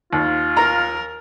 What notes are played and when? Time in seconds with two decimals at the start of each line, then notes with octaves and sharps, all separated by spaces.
0.13 D#2 F4
0.57 A#4 A#5